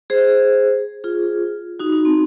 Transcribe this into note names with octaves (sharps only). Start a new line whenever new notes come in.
G#4 C5
F4 G#4
D#4 F#4
D#4
C4